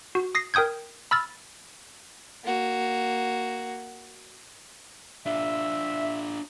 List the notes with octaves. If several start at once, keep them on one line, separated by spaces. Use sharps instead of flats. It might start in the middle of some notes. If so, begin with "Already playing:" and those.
F#4
D#6 A#6 C7
A#4 G5 D#6 G6 G#6
B5 E6 F6 A6
A#3 F#4
D4 F4 E5